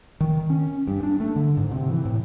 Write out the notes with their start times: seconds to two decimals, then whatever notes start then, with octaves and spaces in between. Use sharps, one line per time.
0.21 D#3
0.50 C#4
0.88 G2
1.03 D4
1.20 A3
1.36 D3
1.57 G#2
1.71 C3
1.89 E3
2.05 A2